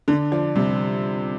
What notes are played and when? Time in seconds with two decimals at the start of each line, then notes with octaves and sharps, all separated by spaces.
0.08 D3 D4
0.32 F3 D5
0.56 C3 G3